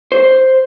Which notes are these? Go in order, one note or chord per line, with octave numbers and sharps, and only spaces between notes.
C5